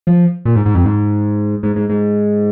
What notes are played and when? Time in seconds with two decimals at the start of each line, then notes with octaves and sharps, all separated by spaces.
0.07 F3
0.45 A#2
0.55 G#2
0.66 G#2
0.75 F2
0.85 G#2
1.63 G#2
1.76 G#2
1.89 G#2